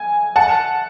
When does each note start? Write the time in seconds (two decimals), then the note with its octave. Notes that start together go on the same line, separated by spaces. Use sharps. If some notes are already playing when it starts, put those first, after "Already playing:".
Already playing: G#5
0.36 F#5 A5